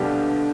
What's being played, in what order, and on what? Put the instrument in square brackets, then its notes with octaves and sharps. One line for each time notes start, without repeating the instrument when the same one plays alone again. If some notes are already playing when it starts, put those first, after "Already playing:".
Already playing: [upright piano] B1 B2 G3 D4 G4 [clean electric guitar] D3